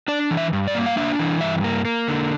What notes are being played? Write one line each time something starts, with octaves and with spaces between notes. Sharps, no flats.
D4 D5
E3
E5
G2
D5
A#3
F5
D4 E5
E3
G2 E5
A#3
A#3
D3